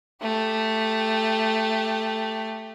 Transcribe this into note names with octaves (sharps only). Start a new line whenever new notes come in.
A3 G4